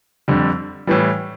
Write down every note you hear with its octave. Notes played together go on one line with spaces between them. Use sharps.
F2 D3 G3
A2 E3 G3